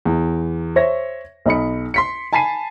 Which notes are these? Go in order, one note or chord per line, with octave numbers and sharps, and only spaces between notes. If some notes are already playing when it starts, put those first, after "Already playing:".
E2
C5 C#5 E5 A#6
B1 D#4 B5 C#7
C6 B6 C#7
G#5 A5 B5 B6 C7 D#7